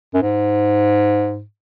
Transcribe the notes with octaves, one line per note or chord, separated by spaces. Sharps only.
F#2
G#2